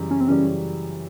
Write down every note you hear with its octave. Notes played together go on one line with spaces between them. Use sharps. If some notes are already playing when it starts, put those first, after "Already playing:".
Already playing: F#2 C#3 E3 G3
C#4
C4
F#2 C#3 E3 G3 C#4